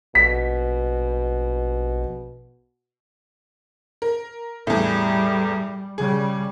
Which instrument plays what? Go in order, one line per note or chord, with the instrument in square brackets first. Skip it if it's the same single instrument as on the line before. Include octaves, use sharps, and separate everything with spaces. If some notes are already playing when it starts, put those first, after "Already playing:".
[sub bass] A#1 [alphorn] B2 [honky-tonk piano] B6
[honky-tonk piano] A#4
[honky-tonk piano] E2 A2 [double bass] G3
[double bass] C#3 G3 [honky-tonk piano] G#4